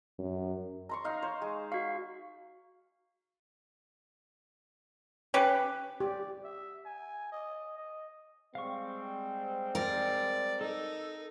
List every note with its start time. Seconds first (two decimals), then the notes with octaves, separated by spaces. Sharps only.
0.19 F#2
0.89 A#5 C6 C#6
1.04 D#4 F5
1.22 C5 C#5
1.42 G#3
1.72 F#4 F5 C#6
5.34 C#4 G4 B4 C#5 G5
6.00 G4 D5
6.44 E5
6.86 G#5
7.32 D#5
7.78 D#5
8.55 G3 G#3 C4 F5 C#6
9.75 A#4 D5
10.61 D#4 A4